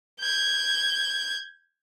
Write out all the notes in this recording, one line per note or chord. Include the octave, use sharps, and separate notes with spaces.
G6 G#6